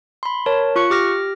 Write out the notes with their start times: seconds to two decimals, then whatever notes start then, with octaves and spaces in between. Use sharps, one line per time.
0.23 B5 C6
0.46 A#4 C#5 A5
0.76 F4 C#6 F#6 C#7
0.90 G4 D6 F6 A#6